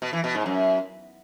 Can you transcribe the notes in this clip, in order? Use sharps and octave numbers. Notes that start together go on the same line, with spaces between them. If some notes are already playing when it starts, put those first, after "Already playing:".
B2
E3
B2
G#2
F#2